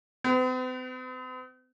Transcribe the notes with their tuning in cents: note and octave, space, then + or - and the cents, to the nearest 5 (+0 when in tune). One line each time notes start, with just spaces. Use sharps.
C4 -45 B4 +40